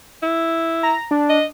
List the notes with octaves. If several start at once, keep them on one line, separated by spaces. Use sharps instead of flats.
E4
A#5
D4
D#5